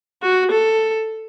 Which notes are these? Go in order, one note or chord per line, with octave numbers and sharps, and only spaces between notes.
F#4
A4